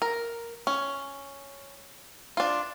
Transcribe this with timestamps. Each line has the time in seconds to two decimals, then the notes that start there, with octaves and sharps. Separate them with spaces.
0.02 A#4
0.67 C#4
2.37 D4 F4